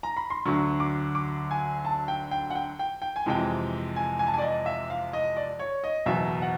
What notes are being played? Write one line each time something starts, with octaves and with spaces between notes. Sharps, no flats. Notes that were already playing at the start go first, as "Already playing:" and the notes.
A#5
B5
C6
D2 D3 F#3 C#6
D6
D6
G#5
A5
G5
G5
F#5
G5
G5
G5
G#5
F2 C3 E3 G#3 G5
G#5
G#5
A5
G#5
D5
D#5
E5
F5
D#5
D5
C#5
D#5
F#1 E2 B2 F#3 E5
F#5